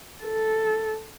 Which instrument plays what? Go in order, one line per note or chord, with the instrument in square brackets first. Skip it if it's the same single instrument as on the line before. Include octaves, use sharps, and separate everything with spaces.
[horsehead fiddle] A4